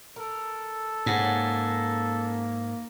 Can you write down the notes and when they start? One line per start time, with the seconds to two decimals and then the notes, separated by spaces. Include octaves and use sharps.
0.16 A4 A#4
1.06 G#2 C#3 A#3 F#5